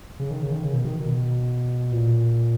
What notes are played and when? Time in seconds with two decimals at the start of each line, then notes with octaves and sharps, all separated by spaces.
0.20 C#3
0.31 D#3
0.41 C#3
0.52 D#3
0.63 C#3
0.73 B2
0.85 D#3
1.06 B2
1.92 A#2